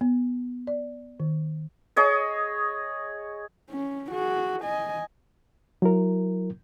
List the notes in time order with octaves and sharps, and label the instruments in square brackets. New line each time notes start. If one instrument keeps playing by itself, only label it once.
[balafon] B3
D5
D#3
[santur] G#4 C#5 D#5
[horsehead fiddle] C#4
F#4 G#4
D#5 G#5
[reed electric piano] F#3 E4 A#4